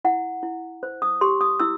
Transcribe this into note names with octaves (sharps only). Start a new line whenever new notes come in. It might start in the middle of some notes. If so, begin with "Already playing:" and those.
E4 F#5
E4
C5
D#6
G4 C6
D#6
E4 E6